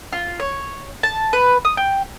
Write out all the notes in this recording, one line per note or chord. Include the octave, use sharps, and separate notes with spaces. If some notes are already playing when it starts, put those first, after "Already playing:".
F4
C#5
A5
B4
D#6
G5